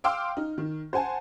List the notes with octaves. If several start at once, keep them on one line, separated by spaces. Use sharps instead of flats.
F5 G5 C6 D6 E6 F6
D#4
D#3
C5 F#5 G#5 A5